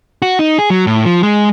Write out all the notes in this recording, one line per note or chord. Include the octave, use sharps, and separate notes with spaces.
F#4
D#4
G#4
F#3
A2
F3
G#3